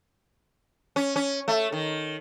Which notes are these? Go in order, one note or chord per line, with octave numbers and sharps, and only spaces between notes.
C#4
C#4
A3
D#3